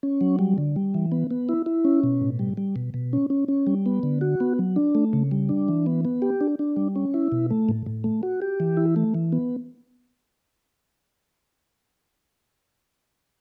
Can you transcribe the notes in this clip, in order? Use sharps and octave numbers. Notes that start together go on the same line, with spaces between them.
C#4
F#3
G3
D3
G3
E3
B3
B3
E4
E4
C#4
B2
A2
G3
G3
B2
B2
C#4
C#4
C#4
G3
B3
D3
F#4
B3
F#3
D4
A3
C#3
G3
D4
E3
B3
B3
G4
D4
D4
G3
C#4
E4
B2
A3
A2
A2
A3
F#4
G4
E3
E4
A3
E3
B3